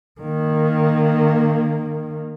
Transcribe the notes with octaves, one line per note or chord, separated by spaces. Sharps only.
D#3 A#3